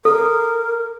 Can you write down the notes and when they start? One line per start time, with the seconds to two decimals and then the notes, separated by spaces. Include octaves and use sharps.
0.05 A4 A#4